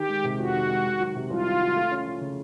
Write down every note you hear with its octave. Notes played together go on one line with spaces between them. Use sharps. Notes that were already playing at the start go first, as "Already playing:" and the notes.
Already playing: D#3 G4
G#3
C3
F2 F#4
D#3
G#3
D#3
F#3
C3
C2 F4
D#3
F#3
A3
C#4
F3
C#3